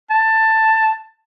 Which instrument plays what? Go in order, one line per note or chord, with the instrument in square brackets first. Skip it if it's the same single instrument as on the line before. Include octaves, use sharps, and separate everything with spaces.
[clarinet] A5